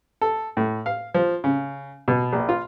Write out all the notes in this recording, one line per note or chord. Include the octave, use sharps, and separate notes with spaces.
A4
A2
F5
F3
C#3
B2
A#1
F4